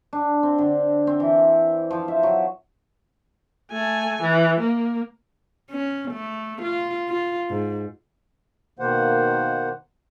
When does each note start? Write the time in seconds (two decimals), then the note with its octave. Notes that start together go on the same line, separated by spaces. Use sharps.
0.13 D4
0.43 C4
0.58 D3
1.07 C4
1.20 E3
1.91 F3
2.08 E5
2.23 F#3
3.71 A3 G#5
4.22 E3
4.60 A#3
5.71 C#4
6.12 A3
6.62 F4
7.09 F4
7.50 G#2
8.79 B2 D#3 A#3 C5 F#5